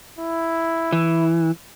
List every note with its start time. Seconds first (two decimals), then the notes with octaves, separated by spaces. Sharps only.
0.18 E4
0.93 E3